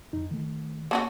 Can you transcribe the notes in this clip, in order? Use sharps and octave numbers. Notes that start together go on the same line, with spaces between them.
F2 D#4
D#3 A3
A#3 C#4 F#4 A5